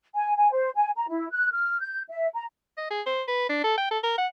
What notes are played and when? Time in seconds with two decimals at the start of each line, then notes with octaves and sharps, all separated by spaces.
0.15 G#5
0.37 G#5
0.52 C5
0.76 G#5
0.96 A#5
1.09 E4
1.31 F#6
1.53 F6
1.81 G6
2.10 E5
2.34 A#5
2.77 D#5
2.90 G#4
3.06 C5
3.28 B4
3.49 D4
3.64 A4
3.78 G5
3.91 A4
4.03 A#4
4.18 F#5